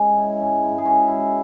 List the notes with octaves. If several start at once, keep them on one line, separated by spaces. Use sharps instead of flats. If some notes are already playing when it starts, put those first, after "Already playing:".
Already playing: G#3 C#4 G#4
G#2
E4
G#2 C#4
E4
G#2
G#4
C#4 F#4
G#2
E4